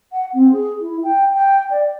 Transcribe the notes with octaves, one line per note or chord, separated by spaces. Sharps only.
F#5
C4
G#4
E4
G5
G5
D5